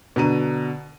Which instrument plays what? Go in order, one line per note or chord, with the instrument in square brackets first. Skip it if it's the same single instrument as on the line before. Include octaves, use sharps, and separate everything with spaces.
[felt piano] B2 D3 A#5 D#7